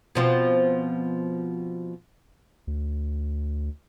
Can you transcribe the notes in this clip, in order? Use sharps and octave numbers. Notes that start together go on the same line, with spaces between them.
B2 F3 C4
D2